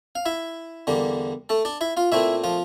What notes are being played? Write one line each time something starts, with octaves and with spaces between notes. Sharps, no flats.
F5
E4 E5
E2 D3 G3 A#3
A3 A4
D4 D5
E4 E5
F4 F5
A#2 A3 C4 E4 E5
F3 F4